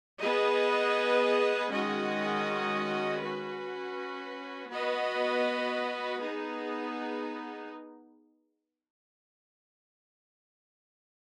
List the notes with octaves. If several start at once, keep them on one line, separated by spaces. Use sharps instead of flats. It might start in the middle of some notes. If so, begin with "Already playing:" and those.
B3 G#4 B4 D#5
D#3 G#3 C#4 F#4 D#5
C#4 F#4 B4
B3 F#4 B4 D#5
B3 D#4 G#4